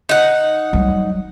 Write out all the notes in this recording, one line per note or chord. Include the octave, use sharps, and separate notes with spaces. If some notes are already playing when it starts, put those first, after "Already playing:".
D#4 F#5
F#3 G3